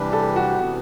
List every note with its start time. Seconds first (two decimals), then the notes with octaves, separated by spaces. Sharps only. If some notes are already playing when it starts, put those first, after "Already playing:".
Already playing: C3 E3 G3 D4 G4 B4
0.13 A4
0.36 F#4
0.59 C3 E3 B3